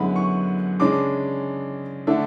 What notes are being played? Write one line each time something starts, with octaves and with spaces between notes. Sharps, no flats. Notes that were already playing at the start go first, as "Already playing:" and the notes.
Already playing: F#2 D3 G#3 B3 E4 B5
C#6
C#3 G#3 D4 D6
D3 A3 D4 E5